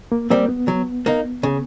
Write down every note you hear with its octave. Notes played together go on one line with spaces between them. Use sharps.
A#3
G3 A#3 C4
B3
F#3
A#3 D#4
C#3